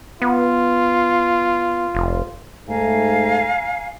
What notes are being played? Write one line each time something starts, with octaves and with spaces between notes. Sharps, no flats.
B3 F4
F1
G#2 A3 F5 G#5 A#5